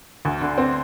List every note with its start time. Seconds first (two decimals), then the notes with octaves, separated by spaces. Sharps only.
0.25 D2
0.41 D3
0.58 C4